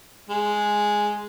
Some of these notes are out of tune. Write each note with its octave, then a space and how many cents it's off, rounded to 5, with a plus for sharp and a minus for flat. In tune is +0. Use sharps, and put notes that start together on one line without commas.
G#3 +0